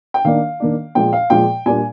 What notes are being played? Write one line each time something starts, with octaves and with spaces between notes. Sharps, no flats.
G5
D#3 A#3 D4 F5
D#3 A#3 D4
A#2 F3 G#3 G5
F5
A#2 F3 G#3 G5
A#2 G3 A#3 D4 G#5